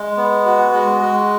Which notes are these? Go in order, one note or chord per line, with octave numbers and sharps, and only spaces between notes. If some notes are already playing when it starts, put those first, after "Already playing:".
Already playing: G#3
B3
F#4
G#3
G#3